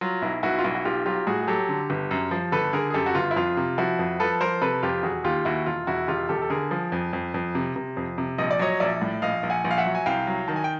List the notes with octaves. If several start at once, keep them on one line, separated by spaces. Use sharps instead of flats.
F#3 F4
B1 E4
B1 E4 F#4
F4
B1 E4 F#4
F#4
B1 F4 G4
F#3 F4 G4
A2 F#4 G#4
G#4
F#3 G4 A4
D3
G1
F#2
F3
G1 A4 B4
D3 G#4 A#4
G#4
F#2 G4 A4
F#4
G1 F4
E4
F2 F4
C3
F3 E4 F#4
F2
F3 A4 B4
F3 A#4 C5
C3 A4 B4
F2 F4 G4
E1 F#4 G#4
D#2 F4 G4
D#2 E4 F#4
E1 F4
E1 E4 F#4
E1 F4 G4
E1 G4 A4
A4
D3 G#4 A#4
F3
F2
F2
F2
C3
C3
F2
C3
A#1 D#5
D5
F#3 C#5 D#5
A#1 D5 E5
A2
A#1 D#5 F5
A#1
F#5 G#5
A#1
F5
E5 F#5
F#3
G#5
C2 F5 G5
F#3
D#3 A5
G#5
G5